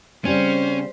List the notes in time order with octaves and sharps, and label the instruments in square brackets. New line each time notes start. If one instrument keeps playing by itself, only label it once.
[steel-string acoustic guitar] C#3 G3 C4 [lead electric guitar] C#4 [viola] C5